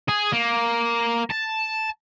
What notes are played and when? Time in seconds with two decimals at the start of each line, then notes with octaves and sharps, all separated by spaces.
0.08 G#4
0.33 A#3
1.31 A5